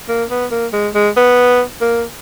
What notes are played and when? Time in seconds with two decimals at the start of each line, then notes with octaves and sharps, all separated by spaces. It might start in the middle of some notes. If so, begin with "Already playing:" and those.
0.09 A#3
0.31 B3
0.51 A#3
0.73 G#3
0.94 G#3
1.16 B3
1.81 A#3